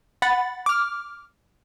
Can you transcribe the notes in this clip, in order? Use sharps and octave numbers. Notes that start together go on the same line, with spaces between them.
F#5 B5 A6
D6 F6